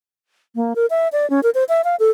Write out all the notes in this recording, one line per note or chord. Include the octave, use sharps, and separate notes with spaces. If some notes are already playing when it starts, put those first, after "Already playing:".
A#3
A#4
E5
D5
C#4
A#4
C5
E5
F5
A4